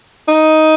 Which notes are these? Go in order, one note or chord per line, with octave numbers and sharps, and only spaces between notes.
D#4